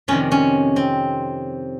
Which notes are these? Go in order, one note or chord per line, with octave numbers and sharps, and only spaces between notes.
F2 C3 D#3 C#4
C#4
C4